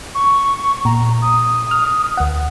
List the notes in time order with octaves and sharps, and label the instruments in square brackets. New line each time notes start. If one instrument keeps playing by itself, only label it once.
[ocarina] C#6
[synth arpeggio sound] A#2 [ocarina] A#5
[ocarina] D#6
[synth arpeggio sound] F6
D2 F#5